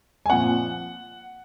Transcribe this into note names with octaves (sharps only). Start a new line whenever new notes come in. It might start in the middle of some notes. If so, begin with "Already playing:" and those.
G#5
A#2 F3 C4 F#5